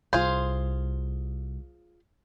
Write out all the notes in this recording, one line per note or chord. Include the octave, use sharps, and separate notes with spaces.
C2 F4 G#4 C5